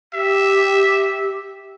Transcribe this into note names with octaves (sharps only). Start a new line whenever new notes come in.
G4 E5